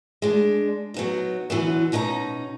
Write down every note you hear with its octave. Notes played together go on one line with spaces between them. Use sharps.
G#3 D4
F#3 B3 D#4
D3 E3 F#3 B3
B2 C#4 D#4 C5 A#5